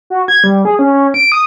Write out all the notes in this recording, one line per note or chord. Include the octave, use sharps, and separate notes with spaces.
F#4
G#6
G3
G#4
C#4
C#4
D7
D#6